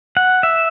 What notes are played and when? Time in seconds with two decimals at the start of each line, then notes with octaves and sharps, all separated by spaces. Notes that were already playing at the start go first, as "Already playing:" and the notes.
0.17 F#5
0.43 E5